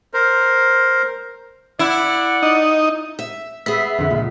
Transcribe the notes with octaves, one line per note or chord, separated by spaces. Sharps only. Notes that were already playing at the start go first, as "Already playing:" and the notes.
A#4 C5
E4 D5 F#5
D#4
E5
B3 G#4 E5 B5
F2 D3
C#2 A#2